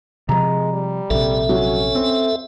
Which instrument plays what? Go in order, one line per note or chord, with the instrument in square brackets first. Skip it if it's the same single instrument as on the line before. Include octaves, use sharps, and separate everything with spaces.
[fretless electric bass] C3 F3 [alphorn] G#3 [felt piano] A#5
[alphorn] G3
[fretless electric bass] A#1 C3 [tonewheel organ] A4 E5
[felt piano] F#3 [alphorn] C#4
[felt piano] C4